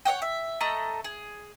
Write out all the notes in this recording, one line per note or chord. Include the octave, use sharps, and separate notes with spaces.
C#5 D5 F#5 G5
E5
A3 A4 D#5 A#5
G#4